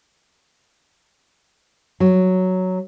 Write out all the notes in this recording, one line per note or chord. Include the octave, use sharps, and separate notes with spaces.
F#3